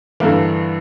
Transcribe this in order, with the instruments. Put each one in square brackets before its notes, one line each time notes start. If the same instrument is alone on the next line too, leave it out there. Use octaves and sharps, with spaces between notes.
[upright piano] G2 D3 A#3 [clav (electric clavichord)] E3